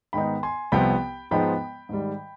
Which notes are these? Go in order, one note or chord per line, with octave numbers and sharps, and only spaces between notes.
G#2 D#3 B3 D#4 G5 B5
G#5 C6
C2 C3 F3 B3 G5 B5
G#2 F3 G#3 B3 D#4 G5 B5
G#2 D#3 G3